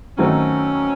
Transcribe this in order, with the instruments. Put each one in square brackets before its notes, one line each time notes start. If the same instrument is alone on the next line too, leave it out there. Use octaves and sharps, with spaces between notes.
[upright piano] D#3 F#3 A3 C4 D#4 [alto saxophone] C#4